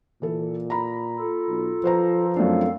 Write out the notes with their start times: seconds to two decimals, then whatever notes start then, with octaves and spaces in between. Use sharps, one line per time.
0.22 A#2 E3 A4
0.70 A#5 B5
1.19 F4 A4
1.48 B1
1.84 F3 B4 C5 A#5
2.36 F#2 A3 C4 D4 A4 F5